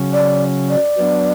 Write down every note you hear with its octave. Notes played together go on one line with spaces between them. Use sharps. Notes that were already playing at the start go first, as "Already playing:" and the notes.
Already playing: C#3 F#3 C#4
D5
D5
F#3 B3 D4